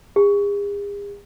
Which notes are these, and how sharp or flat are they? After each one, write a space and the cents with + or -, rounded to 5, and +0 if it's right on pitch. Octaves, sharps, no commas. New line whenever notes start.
G#4 -45